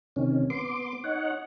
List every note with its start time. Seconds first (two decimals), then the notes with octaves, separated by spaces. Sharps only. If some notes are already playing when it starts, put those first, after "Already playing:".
0.16 C3 D#3 C#4
0.50 B3 C6 D6
1.04 D#4 C#5 F#5